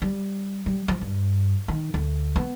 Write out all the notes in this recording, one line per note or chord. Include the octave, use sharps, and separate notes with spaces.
G3
G3
F3
G2
D#3
D2
B3